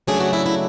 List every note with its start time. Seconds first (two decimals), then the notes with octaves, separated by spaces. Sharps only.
0.07 C#3 F#3 A3 D4 G#4
0.20 F#4
0.33 E4
0.46 E4